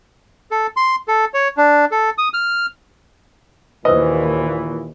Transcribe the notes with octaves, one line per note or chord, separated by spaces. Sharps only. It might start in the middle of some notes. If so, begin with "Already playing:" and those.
A4
C6
A4
C#5
D4
A4
D#6
F6
D#2 A#2 E3 B4 C5 D#5 E6